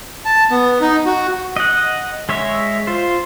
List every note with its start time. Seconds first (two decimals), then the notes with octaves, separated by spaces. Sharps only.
0.25 A5
0.51 B3
0.81 D#4
1.06 F#4
1.56 D#5 F#5
2.29 G#3 C#5 E5
2.87 F4 C5